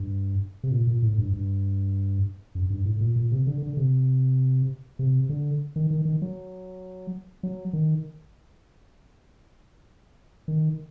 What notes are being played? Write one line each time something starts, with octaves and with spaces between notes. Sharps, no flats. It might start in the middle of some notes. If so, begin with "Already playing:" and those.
Already playing: G2
C3
A#2
A#2
A2
G2
G2
F#2
G2
A2
A#2
A#2
C3
D3
D3
C3
C3
D3
D#3
D#3
D#3
F#3
F#3
D#3
D#3